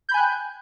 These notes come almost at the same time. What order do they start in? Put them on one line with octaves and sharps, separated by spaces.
G6 B5 G#5 F#6 G5